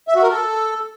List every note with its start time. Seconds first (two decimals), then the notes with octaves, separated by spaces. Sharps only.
0.08 E5
0.15 F#4
0.23 A#4
0.30 A4